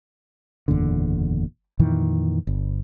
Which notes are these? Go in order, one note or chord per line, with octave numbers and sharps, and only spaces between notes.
F#1 E2 A#2 D3
F2 A#2 D#3 E3
G1